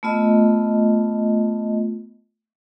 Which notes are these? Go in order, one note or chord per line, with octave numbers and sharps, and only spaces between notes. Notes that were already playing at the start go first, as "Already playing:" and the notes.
A3 B3 F4 D#5